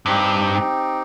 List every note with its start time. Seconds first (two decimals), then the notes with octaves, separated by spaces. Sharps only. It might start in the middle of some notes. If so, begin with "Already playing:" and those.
0.05 G2 C4 D#4 G4